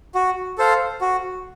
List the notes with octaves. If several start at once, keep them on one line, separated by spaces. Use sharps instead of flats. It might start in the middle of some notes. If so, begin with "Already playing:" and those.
F#4
A4 C5 F5
F#4